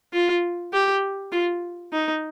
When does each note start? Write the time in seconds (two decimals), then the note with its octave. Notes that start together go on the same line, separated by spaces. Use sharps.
0.13 F4
0.73 G4
1.33 F4
1.93 D#4